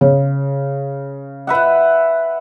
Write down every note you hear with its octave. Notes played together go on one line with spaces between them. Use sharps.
C#3
B4 E5 F#5